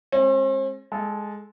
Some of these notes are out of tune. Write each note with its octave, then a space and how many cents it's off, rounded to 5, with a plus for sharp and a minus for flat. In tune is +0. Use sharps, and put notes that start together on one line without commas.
G#3 +0 C4 +45
G#3 +0 A4 -20